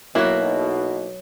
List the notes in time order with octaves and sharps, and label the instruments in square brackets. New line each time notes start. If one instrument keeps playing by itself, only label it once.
[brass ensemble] B1 B2 [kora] F#3 F#4 [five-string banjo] A#3 E4